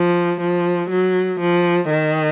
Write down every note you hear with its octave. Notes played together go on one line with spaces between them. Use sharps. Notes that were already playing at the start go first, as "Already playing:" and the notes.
Already playing: F3
F3
F#3
F3
D#3